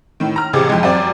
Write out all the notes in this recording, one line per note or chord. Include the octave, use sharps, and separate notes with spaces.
A2 D#3
A#5 F6
A1 C3 G#4 D6
F2 G#3
F#2 C4 D5